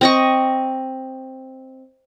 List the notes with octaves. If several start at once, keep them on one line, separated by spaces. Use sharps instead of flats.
C4 D#5 C#6